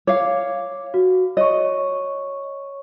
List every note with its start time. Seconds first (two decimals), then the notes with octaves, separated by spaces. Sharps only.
0.07 C#5 F5 D6
0.94 F#4
1.37 C#5 D#5 C#6